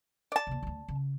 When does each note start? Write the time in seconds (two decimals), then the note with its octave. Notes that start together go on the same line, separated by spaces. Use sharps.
0.32 D5 A5
0.47 D#2 C3
0.63 D2 A3
0.88 C#3